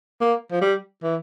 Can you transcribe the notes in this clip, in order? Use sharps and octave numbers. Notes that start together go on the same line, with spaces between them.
A#3
F3
G3
E3